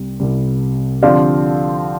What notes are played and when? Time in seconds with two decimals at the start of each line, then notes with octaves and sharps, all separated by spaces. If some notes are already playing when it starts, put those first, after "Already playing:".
Already playing: C2 C3 G3
0.20 C2 C3 G3
1.02 D3 F3 C4 G4 D5 F5